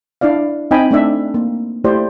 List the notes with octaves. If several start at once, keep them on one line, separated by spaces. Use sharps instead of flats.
D4 E4 D5 F5
C4 D#4 D#5 G5 G#5 B5
A3 D4 E5
A#3
A3 E4 G4 C5 D5